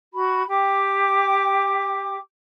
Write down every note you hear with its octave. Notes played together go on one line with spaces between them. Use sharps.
F#4 B5
G4 G5 D6